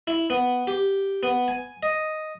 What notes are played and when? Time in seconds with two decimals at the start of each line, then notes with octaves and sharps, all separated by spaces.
0.07 E4
0.30 B3
0.67 G4
1.23 B3
1.48 G#5
1.83 D#5